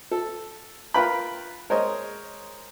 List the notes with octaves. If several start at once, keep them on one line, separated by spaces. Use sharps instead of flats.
A4
F4 A#4 B4 G5 B5
G#3 A#4 C5 C#5 D#5